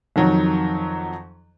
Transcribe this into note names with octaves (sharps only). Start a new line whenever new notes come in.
F2 D#3 F#3